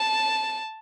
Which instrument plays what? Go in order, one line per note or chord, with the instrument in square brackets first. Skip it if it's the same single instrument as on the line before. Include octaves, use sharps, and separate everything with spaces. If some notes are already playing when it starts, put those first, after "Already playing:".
Already playing: [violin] A5